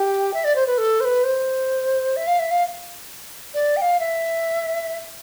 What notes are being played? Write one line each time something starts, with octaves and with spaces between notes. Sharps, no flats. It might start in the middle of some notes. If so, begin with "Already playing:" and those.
Already playing: G4
E5
D5
C5
B4
A4
C5
B4
C5
E5
F5
E5
F5
D5
G5
F5
E5